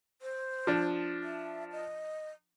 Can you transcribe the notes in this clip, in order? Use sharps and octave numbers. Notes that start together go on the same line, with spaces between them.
C5
F3 D4
E5
D#5